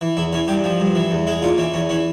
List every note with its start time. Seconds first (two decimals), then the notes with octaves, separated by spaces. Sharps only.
0.01 E3
0.17 E2 E4
0.33 E3 C#4
0.48 G2 G4
0.64 F3
0.80 G2
0.95 E3
1.11 E2
1.27 G#3 E4
1.42 A#2 F4
1.58 E3 C#4
1.74 E2 C#4
1.89 E3 C#4